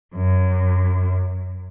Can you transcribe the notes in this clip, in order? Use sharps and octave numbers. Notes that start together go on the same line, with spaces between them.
F#2